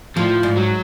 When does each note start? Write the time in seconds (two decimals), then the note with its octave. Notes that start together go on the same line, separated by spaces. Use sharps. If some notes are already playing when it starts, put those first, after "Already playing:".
0.17 A2 F3
0.43 G#2
0.57 F#3